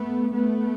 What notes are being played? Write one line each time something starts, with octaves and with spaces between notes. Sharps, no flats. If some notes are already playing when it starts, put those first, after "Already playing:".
Already playing: A3 B3
A3 B3